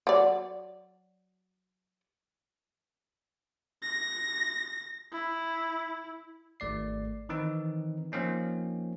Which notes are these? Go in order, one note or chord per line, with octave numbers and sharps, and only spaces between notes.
F#3 D5
A#6
E4
G#1 A3 D5 C7
D#3 E3 C4 D#4
F3 A#3 C4 C#4 D#4